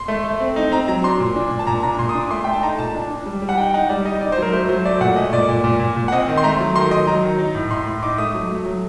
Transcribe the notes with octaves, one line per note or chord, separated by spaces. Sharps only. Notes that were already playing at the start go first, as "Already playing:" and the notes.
Already playing: C6
A3
A3
C4
D#4
C4 A#5
F#3 A#5
D4 C6
A#2
D4
A#2
A5
A#2 A#5
D4 A#5
A#5
A#2 C6
D#6
D4
D6
A3 C6
A3 G5
A5
D#4 A#5
A#2 A5
D4
D4
G3
G3
F#5
D#4 G5
D#4 F#5
G3 D5
D#4 D#5
D#4 D5
C5
F#3 A#4
A3 C5
F#3 C5
A3 D5
A#2 F#5
A3 D#5
A#2 D5
A#2
A#2
A#2
A#2
F#5
C4 D#5
D#3
C6
A3 A#5
F#3
D#3 C6
D#3 D#5
F#3 A#5
D#3
D#4
A2
A2 C6
A2
D#4 D6
A3 D#6
F#3
A3
F#3